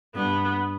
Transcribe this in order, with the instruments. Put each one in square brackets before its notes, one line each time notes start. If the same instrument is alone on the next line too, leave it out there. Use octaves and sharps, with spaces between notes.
[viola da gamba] G2 [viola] B3